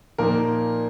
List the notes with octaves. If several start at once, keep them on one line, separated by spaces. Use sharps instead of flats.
A#2 F3 A#3 D#4 A#4